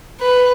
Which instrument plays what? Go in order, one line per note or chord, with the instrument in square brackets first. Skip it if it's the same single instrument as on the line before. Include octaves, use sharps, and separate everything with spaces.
[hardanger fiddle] B4